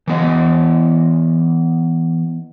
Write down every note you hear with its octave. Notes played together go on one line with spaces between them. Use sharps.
E3 B3 D#5